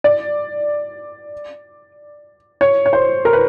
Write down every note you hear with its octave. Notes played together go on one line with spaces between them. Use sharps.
D5
C#5
C#5
C5
A#4
B4